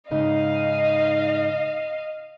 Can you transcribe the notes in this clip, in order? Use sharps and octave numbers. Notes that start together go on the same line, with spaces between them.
G#2 C#3 D#4 D#5 F5